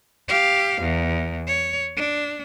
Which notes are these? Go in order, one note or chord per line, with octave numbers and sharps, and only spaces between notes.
G4 F5
E2
C#5
D4